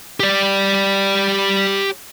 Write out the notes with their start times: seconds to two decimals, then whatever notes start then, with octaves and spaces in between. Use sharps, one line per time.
0.20 G4 D5